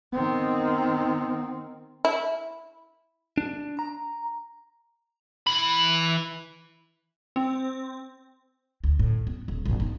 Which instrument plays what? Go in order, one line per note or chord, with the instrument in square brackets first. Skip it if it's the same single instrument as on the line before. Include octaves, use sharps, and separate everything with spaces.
[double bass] D#3 C4 [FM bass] B3
[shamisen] E4
[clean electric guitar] D4
A#5
[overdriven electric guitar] E3 B5
[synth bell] C4
[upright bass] D2
A2
B3
D#1
A#1 G#2
B3 D#4